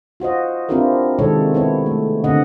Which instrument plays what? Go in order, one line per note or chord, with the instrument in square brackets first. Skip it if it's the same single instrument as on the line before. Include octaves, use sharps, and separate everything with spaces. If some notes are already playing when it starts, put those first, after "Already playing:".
[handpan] F4 F#4 C5 D#5
C4 D4 E4 F4 G4 A#4
C3 D#3 G#3 A4 C#5
B3 E4 C#5
A3
D3 C4 D#5 F#5